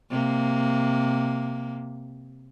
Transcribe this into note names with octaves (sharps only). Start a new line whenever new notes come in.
C3 A#3